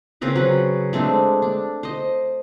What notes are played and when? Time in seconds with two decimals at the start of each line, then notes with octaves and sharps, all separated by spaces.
0.21 C#3 C4 A#4 B4
0.36 F#3 B4 F#5
0.93 G#3 A3 C4 D4
1.42 D4
1.83 C5 D#5